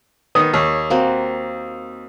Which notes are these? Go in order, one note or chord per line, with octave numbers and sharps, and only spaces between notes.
D#3 B3 D#6
D#2 C#5
A#3 C4 F#4